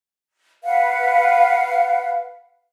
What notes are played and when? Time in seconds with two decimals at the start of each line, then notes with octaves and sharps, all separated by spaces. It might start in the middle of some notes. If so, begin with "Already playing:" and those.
0.64 B4 F5 F#5